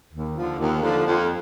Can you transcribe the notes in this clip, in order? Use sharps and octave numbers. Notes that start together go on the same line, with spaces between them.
D#2
D3 F3
D#2
D3 F3
F2